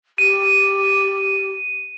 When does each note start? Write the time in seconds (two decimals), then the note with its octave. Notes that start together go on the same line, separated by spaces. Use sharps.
0.18 G4 D#7